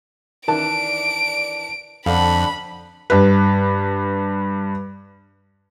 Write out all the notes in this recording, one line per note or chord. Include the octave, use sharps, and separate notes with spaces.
D#3 E3 D4 A#4 A5 D7
F2 D3 D4 F5 F#5 B5
G2 B4